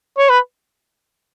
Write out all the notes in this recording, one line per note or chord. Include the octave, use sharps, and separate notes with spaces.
C#5
B4